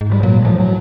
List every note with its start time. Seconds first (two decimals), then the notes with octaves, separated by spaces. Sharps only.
0.01 G#2
0.12 G3
0.23 A#2 F#3
0.45 A2 F3
0.60 F#3